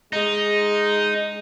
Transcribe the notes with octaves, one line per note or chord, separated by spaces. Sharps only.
G#3 D#4